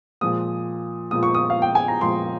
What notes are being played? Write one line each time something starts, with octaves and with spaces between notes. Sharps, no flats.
A#2 F3 G#3 D#6
A#2 F3 G#3 D#6
C#6
D#6
F5
G5
G#5
A#5
A#2 F3 G#3 C6